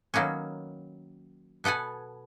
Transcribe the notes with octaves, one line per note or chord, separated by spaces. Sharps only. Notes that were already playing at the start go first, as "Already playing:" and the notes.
D#3 F#3 A#3 B3 C#4
B2 B3 A4 F#5 G#5